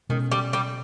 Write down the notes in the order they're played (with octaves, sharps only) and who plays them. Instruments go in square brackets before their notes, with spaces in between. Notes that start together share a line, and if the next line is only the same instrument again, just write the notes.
[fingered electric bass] B2 G#3 C#4 [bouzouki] D#3
[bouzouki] G3
G3